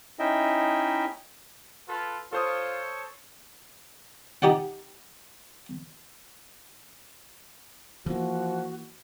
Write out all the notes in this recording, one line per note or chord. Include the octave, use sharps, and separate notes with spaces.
C#4 D#4 E4 D#5 E5 G5
F4 A4 B4
F4 A4 C5 C#5 C#6 D#6
D#4 G4 D5 F#5
E3 F3 A#3 F#4